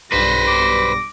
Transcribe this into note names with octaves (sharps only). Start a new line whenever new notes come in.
B1 G2 G3 B4 C5 A#6
D6